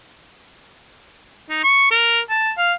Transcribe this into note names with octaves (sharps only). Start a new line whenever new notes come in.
D#4
C#6
A#4
A5
F5